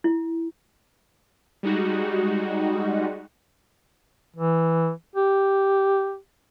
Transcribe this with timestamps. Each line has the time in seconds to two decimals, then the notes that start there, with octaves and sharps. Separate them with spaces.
0.04 E4
1.63 G3 G#3 D#4 F#4
4.36 E3
5.15 G4